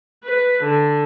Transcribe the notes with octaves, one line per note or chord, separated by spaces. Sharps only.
B4
D3